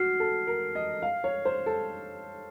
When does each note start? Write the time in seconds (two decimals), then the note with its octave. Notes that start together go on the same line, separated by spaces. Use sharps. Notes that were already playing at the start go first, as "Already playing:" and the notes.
Already playing: F#4 F6 C7
0.20 A4
0.47 A#4
0.75 D#5
1.02 F5
1.24 C#5
1.45 C5
1.66 A4